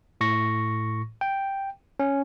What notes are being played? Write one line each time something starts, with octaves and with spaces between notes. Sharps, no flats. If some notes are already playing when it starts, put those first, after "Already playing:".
A2 C#6 A#6
G5
C#4